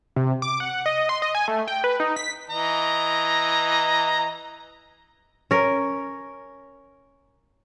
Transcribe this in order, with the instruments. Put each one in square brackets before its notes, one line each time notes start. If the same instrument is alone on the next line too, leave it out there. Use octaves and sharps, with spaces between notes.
[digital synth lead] C3
D6
F#5
D#5
C6
D#5
G#5
A3
G5
B4
D#4
B6
[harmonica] E3 D#5 A#5
[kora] C#4 A#4